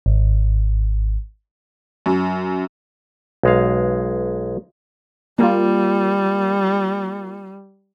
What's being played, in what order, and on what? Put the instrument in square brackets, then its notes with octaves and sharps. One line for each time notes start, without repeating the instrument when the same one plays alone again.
[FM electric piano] G#1
[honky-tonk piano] F#2
[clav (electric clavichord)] B1 G#3 F5
[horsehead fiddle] G3 [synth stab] A#3 F4